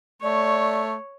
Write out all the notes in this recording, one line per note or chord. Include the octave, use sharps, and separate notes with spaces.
A3 C#5 D5